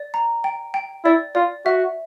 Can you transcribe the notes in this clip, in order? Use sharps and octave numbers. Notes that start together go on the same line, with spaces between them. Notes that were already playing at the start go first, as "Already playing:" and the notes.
Already playing: D5
A#5
G5
G5
E4 D5
F4 D5
F#4 E5